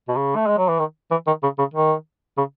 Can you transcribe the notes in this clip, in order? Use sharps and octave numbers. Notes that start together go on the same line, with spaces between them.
B2
C#3
A3
G#3
F#3
E3
D#3
E3
D#3
C#3
C#3
D#3
C#3